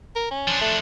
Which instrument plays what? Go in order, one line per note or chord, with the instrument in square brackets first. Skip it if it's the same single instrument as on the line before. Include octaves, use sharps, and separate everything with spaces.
[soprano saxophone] A#4
C#4
[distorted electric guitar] F3 D4
[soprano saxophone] A3